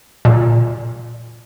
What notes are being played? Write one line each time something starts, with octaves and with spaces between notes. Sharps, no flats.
A#2